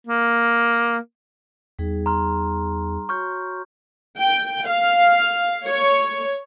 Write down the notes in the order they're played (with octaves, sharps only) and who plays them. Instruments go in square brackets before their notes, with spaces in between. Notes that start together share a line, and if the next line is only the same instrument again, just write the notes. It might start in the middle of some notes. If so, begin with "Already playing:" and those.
[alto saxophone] A#3
[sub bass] E2 [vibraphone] G3 D#4 G#4
[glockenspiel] A#5 C6 F6
[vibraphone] F#4 C#5 [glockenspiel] C#6 F6 G6
[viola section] G5
F5
C#5